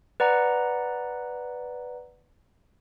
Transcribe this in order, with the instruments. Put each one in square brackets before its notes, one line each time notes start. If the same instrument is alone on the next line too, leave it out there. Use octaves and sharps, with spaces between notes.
[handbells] B4 D5 F#5 A#5